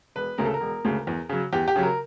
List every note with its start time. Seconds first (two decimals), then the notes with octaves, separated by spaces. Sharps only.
0.15 E1 B4
0.38 D2 C#3 A#4
0.45 A4
0.54 A#4
0.61 E1
0.85 D2 C#3
1.07 E2
1.29 C#3 F#3
1.53 E2 G4
1.68 G4
1.76 C#3 F#3
1.83 A#4